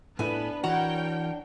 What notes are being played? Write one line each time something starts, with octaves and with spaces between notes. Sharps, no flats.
A2 A3 B3 D4 E4 B4 G#5
E3 F#4 A#4 C#5 F#5 G5 A5 A#5